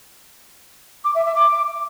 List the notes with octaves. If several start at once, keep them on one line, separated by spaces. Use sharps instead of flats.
D6
E5
E5
D6